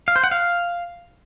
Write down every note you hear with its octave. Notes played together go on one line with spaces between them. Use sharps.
F5
C5
F#5
F5